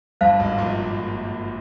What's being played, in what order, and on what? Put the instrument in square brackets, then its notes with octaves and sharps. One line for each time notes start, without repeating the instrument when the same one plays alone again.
[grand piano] G1 G2 [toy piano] C5 F5 A5
[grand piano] G#1 G#2
A#1 A#2